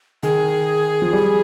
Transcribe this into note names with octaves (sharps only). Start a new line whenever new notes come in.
D#3 G#4
F3
G3